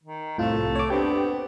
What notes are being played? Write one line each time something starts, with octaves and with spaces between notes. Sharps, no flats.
D#3
C2 F2 A2 A3 F4
C#5 D6
B3 C4 D4 G4 G5